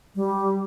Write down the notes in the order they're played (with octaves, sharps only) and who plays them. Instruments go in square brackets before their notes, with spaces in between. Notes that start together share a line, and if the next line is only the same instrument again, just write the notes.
[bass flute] G3